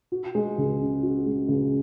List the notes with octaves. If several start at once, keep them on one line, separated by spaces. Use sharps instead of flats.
F#4
G#3
C#2
C#3
F#4
G#3
C#2